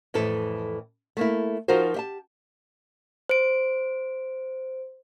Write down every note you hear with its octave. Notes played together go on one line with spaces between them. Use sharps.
F2 A2 E3 A4
A3 A#3 E4
F3 D#4 F4 F#4 A#4 C5
G4 E5 A5
C5 D7